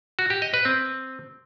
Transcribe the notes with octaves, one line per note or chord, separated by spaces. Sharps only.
F#4
G4
D#5
B4
C4